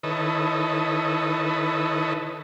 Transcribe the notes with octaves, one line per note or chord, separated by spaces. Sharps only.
D#3 E4 A4 B4 C#5 D#5